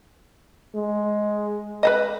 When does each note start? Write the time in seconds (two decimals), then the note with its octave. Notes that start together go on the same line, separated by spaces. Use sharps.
0.75 G#3
1.83 B4 C5 D#5